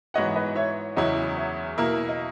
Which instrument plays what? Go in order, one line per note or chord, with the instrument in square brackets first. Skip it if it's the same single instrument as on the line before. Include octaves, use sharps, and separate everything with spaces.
[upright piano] G#2 E3 B3 F#4 C#5 [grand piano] D#5 F#5
[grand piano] B4 D#5
C#5 E5
[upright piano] E2 C#3 F#3 C#4 E4 [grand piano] D#5 F#5
[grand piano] C#5 E5
[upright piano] B2 A#3 E4 A#4
[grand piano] D#5